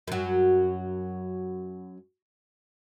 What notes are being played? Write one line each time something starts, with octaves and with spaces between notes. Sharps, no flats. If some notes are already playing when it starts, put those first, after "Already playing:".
F#2 F#3